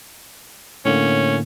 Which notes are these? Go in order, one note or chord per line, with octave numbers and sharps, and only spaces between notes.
A2 D3 A#3 C#4